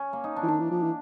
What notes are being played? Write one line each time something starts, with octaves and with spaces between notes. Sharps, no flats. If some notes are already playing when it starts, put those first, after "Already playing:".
Already playing: C#4
A#3
D#4
D4
E3
D#3 D4
E3
F3
E3